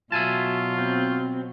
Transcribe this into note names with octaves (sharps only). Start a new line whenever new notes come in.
B2 F#3 F4 E5 G#5 A5
C4